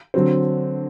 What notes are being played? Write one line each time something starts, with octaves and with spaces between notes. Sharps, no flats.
D3 F#3 C4